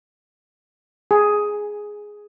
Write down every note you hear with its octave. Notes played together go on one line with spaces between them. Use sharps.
G#4